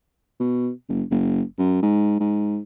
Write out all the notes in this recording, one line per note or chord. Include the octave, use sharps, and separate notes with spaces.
B2
F#1
F#1
F#2
G#2
G#2